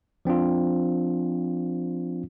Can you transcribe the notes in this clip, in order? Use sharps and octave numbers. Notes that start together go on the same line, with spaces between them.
F3 C4 D4 F4